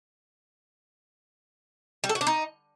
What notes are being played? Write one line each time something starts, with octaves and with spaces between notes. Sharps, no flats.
G3
A4
F#4
D4
D#4